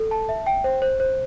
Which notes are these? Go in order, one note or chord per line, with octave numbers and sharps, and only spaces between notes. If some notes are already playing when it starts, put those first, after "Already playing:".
Already playing: A4
A5
E5
G5
C5
C5
C5